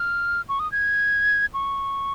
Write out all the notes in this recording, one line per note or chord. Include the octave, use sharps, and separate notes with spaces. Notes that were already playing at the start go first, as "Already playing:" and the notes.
Already playing: F6
C#6
D#6
G#6
C#6